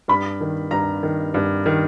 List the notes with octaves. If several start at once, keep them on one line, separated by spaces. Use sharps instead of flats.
G2 B5
D#3
G2 A#5
D#3
G2
D#3